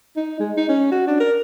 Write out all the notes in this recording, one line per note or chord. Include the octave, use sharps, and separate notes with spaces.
D#4
G#3
D#4
C#4
F#4
D4
A#4